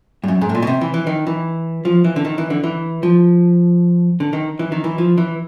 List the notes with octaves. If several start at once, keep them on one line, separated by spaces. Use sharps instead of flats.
G2
F#2
G#2
A2
A#2
B2
C3
E3
E3
D#3
E3
F3
E3
D3
D#3
E3
D3
E3
F3
D3
D#3
E3
D#3
E3
F3
E3